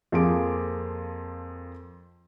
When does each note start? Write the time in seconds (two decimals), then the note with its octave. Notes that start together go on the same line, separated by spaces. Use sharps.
0.12 F2 F3 A#3 G#4 D6 D7